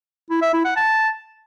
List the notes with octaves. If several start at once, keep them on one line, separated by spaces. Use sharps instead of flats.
E4
E5
E4
F#5
A5